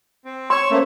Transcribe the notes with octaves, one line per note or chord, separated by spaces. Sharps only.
C4
C#5 C6 E6
A3 A#3 C#4 C5